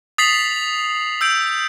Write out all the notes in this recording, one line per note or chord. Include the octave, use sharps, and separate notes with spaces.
D#6 A6 B6 C7 F7 F#7
E6 G6 D7